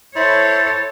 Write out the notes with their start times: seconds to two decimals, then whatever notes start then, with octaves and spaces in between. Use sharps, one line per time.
0.16 E4 A4 C5 C#5 A6